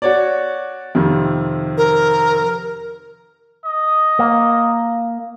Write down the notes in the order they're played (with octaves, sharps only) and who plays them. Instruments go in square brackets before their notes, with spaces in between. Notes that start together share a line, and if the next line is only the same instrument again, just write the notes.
[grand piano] F#4 C#5 D5
F2 C3 D#3
[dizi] A#4
[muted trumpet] D#5
[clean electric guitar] A#3